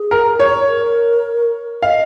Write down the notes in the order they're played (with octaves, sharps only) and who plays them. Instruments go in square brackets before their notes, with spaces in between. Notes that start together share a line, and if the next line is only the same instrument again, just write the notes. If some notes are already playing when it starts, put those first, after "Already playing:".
Already playing: [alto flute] G#4
[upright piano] A#4
C#5
[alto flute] A#4
[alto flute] D#5 [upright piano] F5